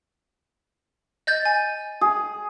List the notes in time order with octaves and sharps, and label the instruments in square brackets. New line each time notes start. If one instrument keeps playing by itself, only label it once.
[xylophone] D#5 G6 A6
G#5
[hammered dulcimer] G#4